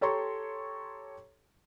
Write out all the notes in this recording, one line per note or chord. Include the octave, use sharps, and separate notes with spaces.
G4 A4 C#5 A#5 C6 C#6